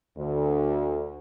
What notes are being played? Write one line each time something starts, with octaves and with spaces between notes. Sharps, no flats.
D2